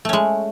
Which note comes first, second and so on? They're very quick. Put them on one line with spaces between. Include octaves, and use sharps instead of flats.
A3 C#4 G#3